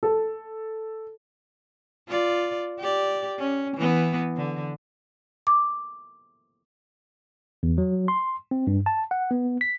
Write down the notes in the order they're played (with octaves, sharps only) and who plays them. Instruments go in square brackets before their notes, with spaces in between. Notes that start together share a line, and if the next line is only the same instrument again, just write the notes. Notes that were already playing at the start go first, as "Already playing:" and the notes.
[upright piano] A4
[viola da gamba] F4 D5
G4 D5
C#4
E3 B3
D3
[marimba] D6
[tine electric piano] E2
F#3
C6
C4
G2
A5
F#5
B3
B6